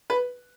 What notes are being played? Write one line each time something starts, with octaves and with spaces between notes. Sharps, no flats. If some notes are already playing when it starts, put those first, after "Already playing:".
B4